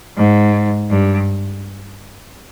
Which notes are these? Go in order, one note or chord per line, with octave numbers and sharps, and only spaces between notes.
G#2
G2